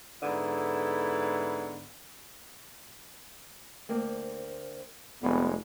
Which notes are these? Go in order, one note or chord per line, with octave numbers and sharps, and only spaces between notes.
G#2 D3 B3 E4
D2 A#3 C4
F1 G3 G#3 B3 D#4